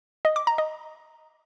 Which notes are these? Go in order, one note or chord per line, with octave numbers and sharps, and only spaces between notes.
D#5
D6
A#5
D#5